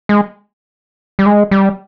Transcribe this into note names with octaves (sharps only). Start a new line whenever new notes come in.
G#3
G3
G#3
G3